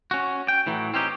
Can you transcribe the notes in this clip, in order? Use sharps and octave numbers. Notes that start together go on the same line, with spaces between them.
C#4 F#4
G5
A2 E3 F#3
C4 C#4 D#4 G4